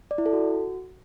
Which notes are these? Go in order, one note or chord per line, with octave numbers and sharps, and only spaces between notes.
D5
E4
A4
F#4